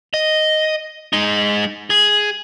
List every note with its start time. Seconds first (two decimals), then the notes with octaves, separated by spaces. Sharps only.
0.14 D#5
1.13 G#3 D#4
1.90 G#4